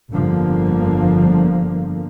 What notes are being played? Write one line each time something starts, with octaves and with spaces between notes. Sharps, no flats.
G1 F2 D3 F3 A#3